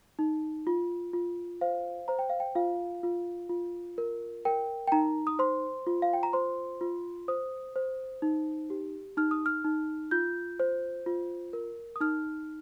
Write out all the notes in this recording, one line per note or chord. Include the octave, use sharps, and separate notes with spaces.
D#4
F4
F4
C5 F5
C5 A#5
G5
F5
G5
F4 F5
F4
F4
A#4
A#4 G5
G5
D#4 A#5
D#6
C5 C6
F4
F5
G5
A#5
C5 C6
F4
C5 D#6
C5
D#4
G4
D#4 F6
D#6
F6
D#4
F4 G6
C5
F4
A#4
D#6
D#4 F6